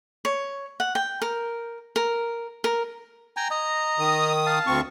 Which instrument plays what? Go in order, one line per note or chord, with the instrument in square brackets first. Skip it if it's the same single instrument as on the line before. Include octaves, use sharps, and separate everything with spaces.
[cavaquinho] C#5
F#5
G5
A#4
A#4
A#4
[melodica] G5 G#5 A#5
D#5 A#5
[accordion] D#3 D#6
[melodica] F5 A5
[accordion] D2 C4 C#6